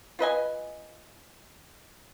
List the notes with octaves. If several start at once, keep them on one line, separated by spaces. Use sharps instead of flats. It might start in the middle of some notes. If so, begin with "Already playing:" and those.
F4 B4 D#5 G#5